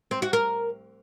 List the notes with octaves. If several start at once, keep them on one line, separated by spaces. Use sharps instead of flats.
C4
F#4
A#4